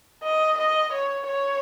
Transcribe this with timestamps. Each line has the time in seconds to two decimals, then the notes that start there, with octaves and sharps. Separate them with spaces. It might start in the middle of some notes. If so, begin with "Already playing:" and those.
0.23 D#5
0.57 D#5
0.92 C#5
1.27 C#5